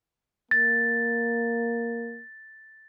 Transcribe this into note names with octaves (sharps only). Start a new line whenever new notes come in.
A#3 A6